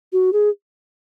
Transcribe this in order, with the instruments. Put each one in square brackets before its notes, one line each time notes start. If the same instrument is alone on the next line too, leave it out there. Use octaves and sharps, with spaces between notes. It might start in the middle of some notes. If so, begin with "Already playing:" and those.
[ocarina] F#4
G#4